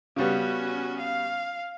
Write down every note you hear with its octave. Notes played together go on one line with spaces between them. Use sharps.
C#3 G3 B3 C#4 F#4
F5